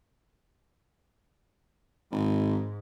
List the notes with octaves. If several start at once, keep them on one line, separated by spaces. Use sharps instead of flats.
G#1 G#2